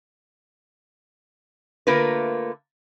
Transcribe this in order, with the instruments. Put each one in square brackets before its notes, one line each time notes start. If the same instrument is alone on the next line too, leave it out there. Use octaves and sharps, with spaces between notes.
[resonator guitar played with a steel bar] D3 A3 A#3 F4 A#4 B4